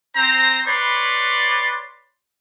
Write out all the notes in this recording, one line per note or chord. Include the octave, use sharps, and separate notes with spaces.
C4 C5 A#5
B4 C#5 D5 B5 C6